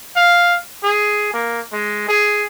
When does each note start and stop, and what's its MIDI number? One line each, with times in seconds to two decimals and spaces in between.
0.16 0.57 77
0.83 1.29 68
1.34 1.60 58
1.72 2.06 56
2.08 2.46 68